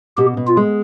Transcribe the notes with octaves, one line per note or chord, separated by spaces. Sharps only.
B2 G4
B2
F4
G#3